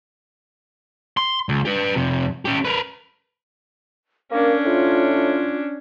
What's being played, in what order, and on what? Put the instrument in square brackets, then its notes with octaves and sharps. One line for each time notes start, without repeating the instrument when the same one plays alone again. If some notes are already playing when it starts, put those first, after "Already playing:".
[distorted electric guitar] C6
C#2
G4 B4
F2 C3
C#4 G4
A#4 B4
[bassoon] A#3 [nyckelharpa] C#4 D4 [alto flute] A#4
[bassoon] A2 [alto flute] F4
[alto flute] F4